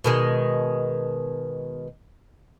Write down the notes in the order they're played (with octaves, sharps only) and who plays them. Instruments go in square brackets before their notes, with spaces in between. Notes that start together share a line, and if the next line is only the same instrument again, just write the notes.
[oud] B2 D#3 G#3